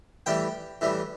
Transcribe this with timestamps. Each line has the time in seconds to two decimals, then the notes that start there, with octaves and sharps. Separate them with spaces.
0.26 A2 E3 G3 G5
0.81 A2 E3 G3